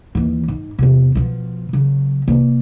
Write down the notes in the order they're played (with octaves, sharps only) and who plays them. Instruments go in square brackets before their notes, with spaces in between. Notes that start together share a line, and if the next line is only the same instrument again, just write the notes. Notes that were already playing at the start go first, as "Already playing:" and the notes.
[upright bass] D#2 E3
G#2
E2 C3
B2 F3
C#3 F#3
C3 A#3